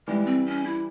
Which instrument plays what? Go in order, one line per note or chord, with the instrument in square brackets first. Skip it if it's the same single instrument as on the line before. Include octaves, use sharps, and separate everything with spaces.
[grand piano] E3 G3 [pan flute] G#3
[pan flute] C4
C#4
E4